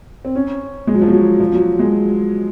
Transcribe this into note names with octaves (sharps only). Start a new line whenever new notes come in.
C4
C#4
G#3
F#3
F3
F#3
F3
F#3
G#3